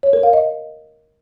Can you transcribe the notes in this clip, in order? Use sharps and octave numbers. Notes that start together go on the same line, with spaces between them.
C#5
A#4
F5
D#5